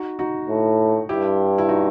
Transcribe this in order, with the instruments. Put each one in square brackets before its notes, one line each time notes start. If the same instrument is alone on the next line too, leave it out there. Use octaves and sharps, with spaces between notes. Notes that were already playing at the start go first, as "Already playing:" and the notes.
Already playing: [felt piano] D#4 F#4
D#4 F#4
[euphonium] A2
[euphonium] G2 [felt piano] E4 G4
[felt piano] E4
D#4 F#4